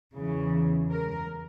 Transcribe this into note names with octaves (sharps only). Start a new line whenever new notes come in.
E2 C#3 E3
A#4